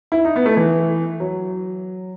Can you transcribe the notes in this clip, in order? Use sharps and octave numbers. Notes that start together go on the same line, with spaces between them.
E4
D#4
B3
A3
E3
F#3